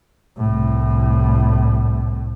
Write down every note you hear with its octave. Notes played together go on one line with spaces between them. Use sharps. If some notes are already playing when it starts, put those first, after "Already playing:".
C2 A2